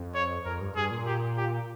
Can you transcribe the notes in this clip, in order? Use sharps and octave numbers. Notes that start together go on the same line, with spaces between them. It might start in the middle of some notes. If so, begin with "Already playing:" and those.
Already playing: F2
C#5
F2 A#4
G2
G2 G#4
A#2
G4
G4